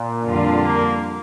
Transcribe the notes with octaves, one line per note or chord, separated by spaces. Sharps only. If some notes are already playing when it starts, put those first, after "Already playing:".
Already playing: A#2
F2 D3 G3 D4 F4
A#3